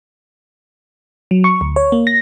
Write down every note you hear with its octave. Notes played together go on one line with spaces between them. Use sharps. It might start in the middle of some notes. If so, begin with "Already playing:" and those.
F#3
C#6
D2
C#5
A#3
A#6